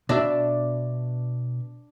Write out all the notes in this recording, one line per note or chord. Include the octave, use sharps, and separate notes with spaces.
B2 D4 E5